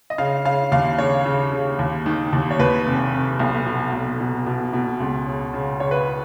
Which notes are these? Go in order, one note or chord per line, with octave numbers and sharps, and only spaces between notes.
D#5
C#3 F5
C#3 F5
D#2 F5
C#3 C#5
C#3
C#3
D#2
D#3
D#2
C#5
D#2 B4
F1
F1
B1
B2
B1
B2
B2
B2
C#2
C#3
C#3
C#3 C#5
B4